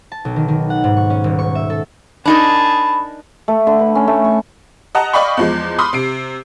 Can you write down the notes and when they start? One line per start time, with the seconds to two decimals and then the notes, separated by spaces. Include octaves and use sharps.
0.12 A5
0.25 B1
0.36 D#3
0.48 D#3
0.70 F#5
0.84 G#2
0.97 C#6
1.10 C#4
1.24 D#1
1.39 C#6
1.55 E5
1.70 A4
2.25 D4 D#4 G#4 A#4 A5 B5
3.48 A3
3.67 D3
3.79 B4
3.95 C#4
4.07 A3
4.25 C#6
4.95 D#5 F#5 A5 A#5
5.13 D5 D#5 F5 G5 B5 C#6
5.37 E2 F3 G#3
5.78 B5 C6 D6 D#6 F6
5.93 C3 C7 D7